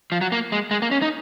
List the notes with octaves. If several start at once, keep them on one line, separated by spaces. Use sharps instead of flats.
F3
F#3
A#3
G#3
G#3
A#3
C#4
D#4